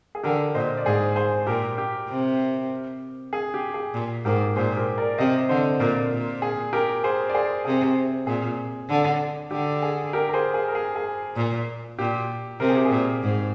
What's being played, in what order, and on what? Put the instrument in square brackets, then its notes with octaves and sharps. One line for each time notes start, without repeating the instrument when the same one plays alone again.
[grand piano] G#4
[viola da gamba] D3 [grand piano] G4 A#4
[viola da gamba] A#2 [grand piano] C5 D#5
[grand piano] D5
[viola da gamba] G#2 [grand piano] G#4 C5
[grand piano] G#4 C5
[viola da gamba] A#2 [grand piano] G4 A#4
[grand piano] G4
[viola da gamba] C3
[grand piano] G#4
G4
G#4
[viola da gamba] A#2
[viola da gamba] G#2 [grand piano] G4 A#4
[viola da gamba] A#2 [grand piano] G#4 C5
[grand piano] G4 A#4
A#4 D5
[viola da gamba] C3 [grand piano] C5 D#5
[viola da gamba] D3 [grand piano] C5 D#5
[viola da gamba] A#2 [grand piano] A#4 D5
[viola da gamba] A#2
[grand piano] G#4
G4 A#4
G#4 C5
D5
G#4 C5
[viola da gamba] C3 [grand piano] G#4
[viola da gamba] A#2 [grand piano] G#4
[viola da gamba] D3
[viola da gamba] D3 [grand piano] G4
[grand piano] G#4
G4 A#4
A#4
G#4 C5
G#4
A#4
G#4
G#4
[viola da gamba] A#2
[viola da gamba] A#2 [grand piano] G4
[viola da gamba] C3 [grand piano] A#4
[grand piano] G#4
G4
G#4
[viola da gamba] A#2
G#2